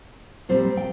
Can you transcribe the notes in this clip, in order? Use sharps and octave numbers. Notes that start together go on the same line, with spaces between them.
A#2 G3 C4 C5
G5